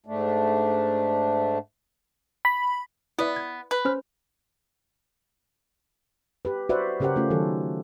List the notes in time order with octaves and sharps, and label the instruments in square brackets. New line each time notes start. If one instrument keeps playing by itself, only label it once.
[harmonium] G#2 A3 D4
[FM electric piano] B5
[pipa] B3 [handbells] E4 D5 E5
[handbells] G#6
[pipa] B4
[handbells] C#4 C5 F6
[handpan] G4 B4
F#4 B4 C5 D5 E5 F#5
C#3 C#4 G4 A#4 C5 F#5
A3 C#4 F4
D#3 F#3 A4